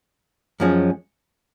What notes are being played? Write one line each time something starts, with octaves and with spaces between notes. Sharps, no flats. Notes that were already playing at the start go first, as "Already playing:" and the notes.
F#2 F3 G#3 C#4